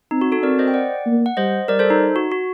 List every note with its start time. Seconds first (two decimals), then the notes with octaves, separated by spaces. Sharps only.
0.11 C4 D#4
0.21 F#4
0.32 F#4 A4
0.43 C4 A#4 D5
0.59 C5 D#5
0.67 G5
0.74 D5 F#5
1.06 A#3
1.26 F#5
1.37 G3 C5 D#5
1.68 G3 A#4 D5
1.79 A4 C5
1.90 D#4
2.16 F#4
2.32 F#4